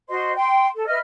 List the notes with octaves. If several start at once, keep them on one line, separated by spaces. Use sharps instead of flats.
F#4 C5 D#5 C6
G5 C6
A4
B4 D#5 E5 F6